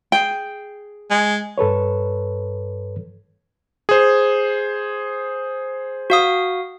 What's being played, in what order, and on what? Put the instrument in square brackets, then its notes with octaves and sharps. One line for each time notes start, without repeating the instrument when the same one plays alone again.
[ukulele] G#4 G5
[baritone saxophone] G#3
[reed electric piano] G2 A4 B4 C#5
[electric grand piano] G#4 C5
[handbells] F#4 F5 D#6